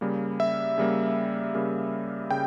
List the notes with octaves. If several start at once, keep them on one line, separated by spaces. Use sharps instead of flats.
C#3 G3 A#3
E5
C#3 G3 A#3
C#3 G3 A#3
C#3 G5